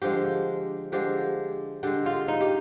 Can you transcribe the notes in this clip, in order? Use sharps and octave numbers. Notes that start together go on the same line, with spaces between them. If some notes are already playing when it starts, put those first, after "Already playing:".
D3 F3 G#3 G4
D3 F3 G#3 G4
D3 G#3 G4
F4
D#4
G4